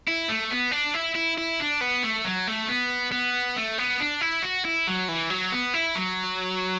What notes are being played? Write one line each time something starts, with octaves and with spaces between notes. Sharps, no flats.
E4
A3
B3
D4
E4
E4
E4
D4
B3
A3
F#3
A3
B3
B3
A3
B3
D4
E4
F#4
E4
F#3
E3
F#3
B3
E4
F#3